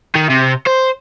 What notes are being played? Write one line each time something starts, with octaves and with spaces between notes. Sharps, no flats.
D#3
C3
C5